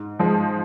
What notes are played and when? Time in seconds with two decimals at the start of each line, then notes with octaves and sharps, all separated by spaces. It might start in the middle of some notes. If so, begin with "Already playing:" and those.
Already playing: G#2
0.19 F3 G#3